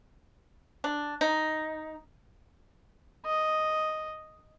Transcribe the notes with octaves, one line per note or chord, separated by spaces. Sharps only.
D4
D#4
D#5